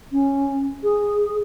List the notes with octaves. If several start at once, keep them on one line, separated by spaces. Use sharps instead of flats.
C#4
G#4